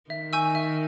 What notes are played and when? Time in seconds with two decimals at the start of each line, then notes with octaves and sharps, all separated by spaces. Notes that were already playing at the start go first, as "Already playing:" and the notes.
0.10 D#3 E5
0.33 G#5 C#6 E6 G6
0.55 E5